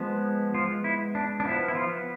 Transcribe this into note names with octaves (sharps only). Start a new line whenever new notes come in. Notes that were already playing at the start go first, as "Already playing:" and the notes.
Already playing: F3 G#3 B3
F3 F4
E4
D4
D4
F3 B3 E4
E4
F3 F4